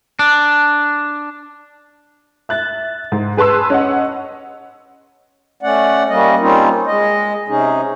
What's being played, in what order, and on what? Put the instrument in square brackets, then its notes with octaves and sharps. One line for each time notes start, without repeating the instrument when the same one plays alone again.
[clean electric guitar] D4
[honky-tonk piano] E5 F#6 A6
G#2
G#4 B4 A5 C6 E6
C#4 D#5 F#5
[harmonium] A3 C#4 D5 F#5
G3 A#3 C#4 D#5
G3 A#3 C4 C#4 D#4 F4
G#3 D#5
C3 C#4 D#4 G#4